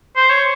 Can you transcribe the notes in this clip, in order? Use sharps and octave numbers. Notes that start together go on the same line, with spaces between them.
C5
C#5